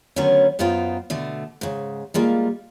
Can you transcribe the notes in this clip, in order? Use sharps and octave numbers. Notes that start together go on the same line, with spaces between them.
D3 D#3 F#3 A3 B3 C#4
F#2 B3 D#4 F4 C5 G5
B2 D3 A3
G#2 C#3
G3 G#3 A#3 F4